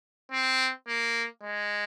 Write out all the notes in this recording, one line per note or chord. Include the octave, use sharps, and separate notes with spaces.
C4
A#3
G#3